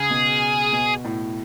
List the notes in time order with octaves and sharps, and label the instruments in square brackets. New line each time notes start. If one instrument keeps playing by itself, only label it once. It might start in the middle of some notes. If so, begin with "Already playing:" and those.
Already playing: [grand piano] C#3 [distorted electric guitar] G#4
[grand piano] B2
B2
A2